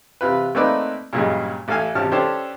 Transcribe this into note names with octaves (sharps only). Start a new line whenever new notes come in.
C3 F4 B4
A3 A#3 C4 D#4 B4 D5
G2 A#2 C#3 F#3 G#3
A1 A4 F5 G#5
G#1 C3 C#4 A5 F6
C#4 D4 G4 A4 C5 A5